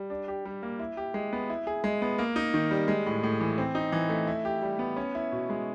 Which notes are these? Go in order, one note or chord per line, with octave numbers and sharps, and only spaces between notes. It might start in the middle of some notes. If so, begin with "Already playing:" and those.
Already playing: G3
D4
G4
G3
A#3
E4
G4
G#3
B3
E4
G#4
G#3
B3
A#3
D#4
D#3
G3
G#3
A2
A2
E3
C4
D#4
E3
A3
E4
G4
G3
B3
C#4
E4
B2
G#3